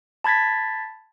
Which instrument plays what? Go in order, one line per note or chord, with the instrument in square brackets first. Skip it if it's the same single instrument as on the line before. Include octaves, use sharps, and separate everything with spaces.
[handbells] A5 B5 G#6 A6 B6